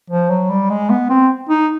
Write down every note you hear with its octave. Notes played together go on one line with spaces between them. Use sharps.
F3
F#3
G3
G#3
B3
C4
D#4